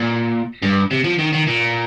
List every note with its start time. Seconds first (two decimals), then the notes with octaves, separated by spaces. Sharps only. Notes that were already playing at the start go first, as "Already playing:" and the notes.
Already playing: A#2
0.62 G2
0.91 C3
1.04 F3
1.19 D#3
1.33 D#3
1.47 A#2